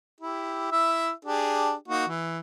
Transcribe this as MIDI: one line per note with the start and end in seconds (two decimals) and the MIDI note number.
0.21 0.70 64
0.21 0.70 67
0.72 1.10 64
0.72 1.10 76
1.25 1.73 62
1.25 1.73 67
1.25 1.73 68
1.88 2.05 58
1.88 2.05 63
1.88 2.05 66
2.07 2.39 52